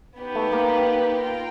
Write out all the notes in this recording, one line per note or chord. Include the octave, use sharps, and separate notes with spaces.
B3 D#4 G4 B4
A3
A#3
F4 A#4 G5